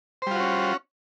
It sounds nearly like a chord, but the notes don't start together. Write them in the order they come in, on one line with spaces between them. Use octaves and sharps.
C5 G3 F4 F#4 C#4